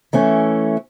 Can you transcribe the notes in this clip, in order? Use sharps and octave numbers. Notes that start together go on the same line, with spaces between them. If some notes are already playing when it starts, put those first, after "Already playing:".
E3 A3 C#4